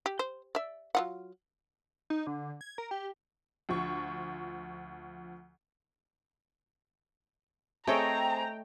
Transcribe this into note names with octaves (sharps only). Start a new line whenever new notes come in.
G4
C5
D5 E5
F#3 F4 F#5
D#4
D3
G#6
A#4
G4
D2 F3 C#6
A3 C4 G#4 C#5 D#5 G5 A#5